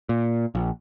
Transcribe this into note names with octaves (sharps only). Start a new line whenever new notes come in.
A#2
A#1